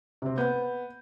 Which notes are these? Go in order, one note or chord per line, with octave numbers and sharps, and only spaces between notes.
C3 C4
B3 G6